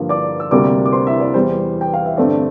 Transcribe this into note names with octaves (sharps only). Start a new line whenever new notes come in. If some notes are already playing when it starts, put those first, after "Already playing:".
Already playing: G2 D3 F3 A#3
D5 D6
E6
D2 C3 G3 A#3 D5 D6
D6
C5 C6
E4 E5
D5
E2 E3 G3 C5
G5
F5
E5
G2 D3 A3 C4 D5